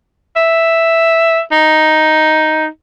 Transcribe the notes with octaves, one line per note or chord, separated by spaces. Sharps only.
E5
D#4